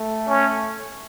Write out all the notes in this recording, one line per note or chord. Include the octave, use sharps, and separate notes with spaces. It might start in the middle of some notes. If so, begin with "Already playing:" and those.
Already playing: A3
C#4